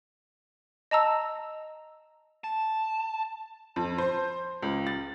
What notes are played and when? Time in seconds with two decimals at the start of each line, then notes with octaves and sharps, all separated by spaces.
0.91 D#5 A5 A#5 E6
2.44 A5
3.76 F2
3.98 C5
4.62 C#2
4.87 A6